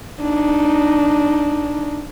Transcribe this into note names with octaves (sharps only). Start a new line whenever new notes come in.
D4 D#4